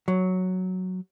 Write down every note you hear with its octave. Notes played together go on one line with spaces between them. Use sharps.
F#3